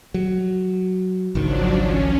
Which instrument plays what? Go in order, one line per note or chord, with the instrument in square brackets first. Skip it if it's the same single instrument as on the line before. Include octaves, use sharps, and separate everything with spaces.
[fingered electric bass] F#3
[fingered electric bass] G#1 C#2 D#3 [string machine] F3 F#3 D4
[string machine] C#4